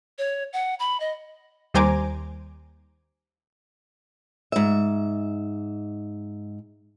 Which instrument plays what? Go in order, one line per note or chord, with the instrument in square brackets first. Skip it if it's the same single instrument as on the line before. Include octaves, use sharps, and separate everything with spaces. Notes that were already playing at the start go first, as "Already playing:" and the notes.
[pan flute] C#5
F#5
B5
D#5
[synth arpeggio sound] D#2 G3 C5 G#5 A#5 D6
[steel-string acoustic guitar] G#2 E5